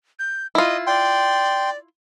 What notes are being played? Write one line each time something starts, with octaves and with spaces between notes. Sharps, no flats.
G6
E4 F4 D#5
D5 G5 C6